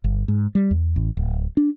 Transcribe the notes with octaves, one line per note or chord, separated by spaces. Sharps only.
G1
G#2
G3
E2
A1
D1
D4